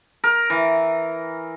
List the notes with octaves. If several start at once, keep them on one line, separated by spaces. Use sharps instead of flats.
A#4
E3